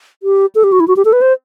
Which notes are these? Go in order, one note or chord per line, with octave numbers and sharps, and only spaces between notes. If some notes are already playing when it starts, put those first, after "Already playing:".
G4
A4
G4
F#4
E4
F#4
G4
A4
B4
C5